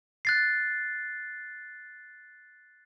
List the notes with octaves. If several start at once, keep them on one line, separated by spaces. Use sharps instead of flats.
F#6 A6 C7